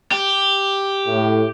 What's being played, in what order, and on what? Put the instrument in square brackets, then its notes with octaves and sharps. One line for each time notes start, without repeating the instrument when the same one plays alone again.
[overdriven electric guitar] G4
[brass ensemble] A2